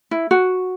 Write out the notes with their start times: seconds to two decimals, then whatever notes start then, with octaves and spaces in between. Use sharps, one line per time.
0.11 E4
0.31 F#4